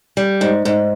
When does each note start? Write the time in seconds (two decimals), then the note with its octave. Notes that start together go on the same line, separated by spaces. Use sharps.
0.17 G3
0.41 G#2
0.65 G#2